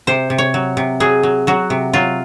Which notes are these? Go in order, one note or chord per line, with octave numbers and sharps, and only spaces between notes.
C3 C5
C3
C#5
F#3
C3
F#3 G#4
F#3
F#3 F#4
C3
F#3 F4